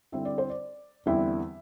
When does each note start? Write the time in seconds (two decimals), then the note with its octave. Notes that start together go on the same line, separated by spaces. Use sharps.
0.12 D3 G3 C4 E4 E5
0.25 D5
0.38 C5
0.50 D5
1.06 E2 D3 G3 C4 E4 E5